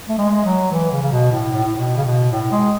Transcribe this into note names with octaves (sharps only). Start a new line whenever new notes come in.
A3
G#3
F#3
E3
C#3
C#3
B2
A2
A2
B2
C#3
B2
A2
G#3